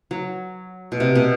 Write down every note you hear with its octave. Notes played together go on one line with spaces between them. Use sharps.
F#3
B2
C3
B2